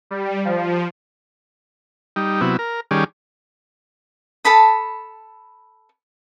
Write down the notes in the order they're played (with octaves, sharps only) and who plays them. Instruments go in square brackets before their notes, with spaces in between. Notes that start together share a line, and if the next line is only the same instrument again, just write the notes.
[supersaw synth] G3
F3
[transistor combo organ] G3 D#4
C3 F#3 B3 E4
A#4
D#3 G3 C#4 G#4 D5
[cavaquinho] A4 A5 B5 D#6